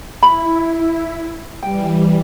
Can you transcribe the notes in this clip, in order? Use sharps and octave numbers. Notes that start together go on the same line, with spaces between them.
E4 B5
E3 G3 G5